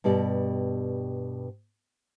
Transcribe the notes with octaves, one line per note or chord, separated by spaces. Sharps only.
G2 B2 G4 D5